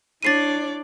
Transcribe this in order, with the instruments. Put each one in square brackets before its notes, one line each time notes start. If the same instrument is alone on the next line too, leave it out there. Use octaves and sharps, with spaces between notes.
[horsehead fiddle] D4 E4 [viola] C#5 D5 [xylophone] A6 C7 D#7